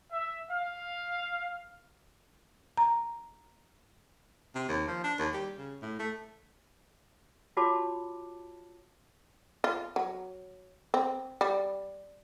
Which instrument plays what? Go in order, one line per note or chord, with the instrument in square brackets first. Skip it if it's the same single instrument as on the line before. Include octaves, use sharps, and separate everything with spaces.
[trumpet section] E5
F5
[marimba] A#5
[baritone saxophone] C3
D#2
F3
D4
D#2
G3
C#3
A2
A3
[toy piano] F4 F#4 C#5 A5 B5 D6
[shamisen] F4
F#3
C4
G3